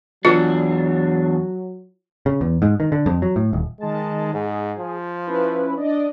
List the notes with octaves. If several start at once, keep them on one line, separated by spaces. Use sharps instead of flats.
E2 F#3 D4 F4
C#3
E2
G#2
D#3
D3
F2
F#3
A2
D#1
D#3 G#3 A5
G#2 G#4
F3
C#4 E4 B4
D4 D5 D#5